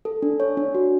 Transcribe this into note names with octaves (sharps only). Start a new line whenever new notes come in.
A4
D4
C#5
D4
F#4